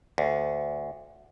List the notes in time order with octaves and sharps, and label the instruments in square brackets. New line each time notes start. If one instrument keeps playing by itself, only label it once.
[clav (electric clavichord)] D2